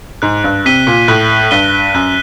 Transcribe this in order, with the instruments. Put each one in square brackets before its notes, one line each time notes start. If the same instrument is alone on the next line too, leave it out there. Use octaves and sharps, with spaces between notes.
[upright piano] G#2 [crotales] F#6
[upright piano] G2
[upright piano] C3 [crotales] B6 D#7 G7
[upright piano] A#2
[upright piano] A2 [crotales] F#6
[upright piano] G2 [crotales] B6 D#7 G7
[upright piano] F#2 [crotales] F#6